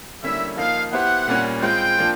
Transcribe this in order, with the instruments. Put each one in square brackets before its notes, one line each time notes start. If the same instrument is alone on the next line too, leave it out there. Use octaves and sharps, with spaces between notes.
[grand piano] D3 G3 A#3 C#4 E4 [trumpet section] E5
[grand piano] F3 A#3 D#4 [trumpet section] F5
[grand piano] B3 E4 G4 C5 [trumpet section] F#5
[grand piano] A#2 G3 A#3 C#4
[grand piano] G#3 C4 F4 [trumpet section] G5
[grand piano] F3 A#3 D4 F4